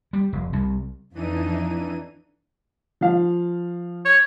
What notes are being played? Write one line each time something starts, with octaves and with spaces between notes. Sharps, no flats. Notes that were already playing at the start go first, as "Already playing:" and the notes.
G3
F1
C2
F2 E3 D4 D#4 D#7
F3 F5
C#5